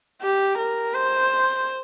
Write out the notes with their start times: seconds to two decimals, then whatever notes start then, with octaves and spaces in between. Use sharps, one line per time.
0.22 G4
0.58 A#4
0.94 C5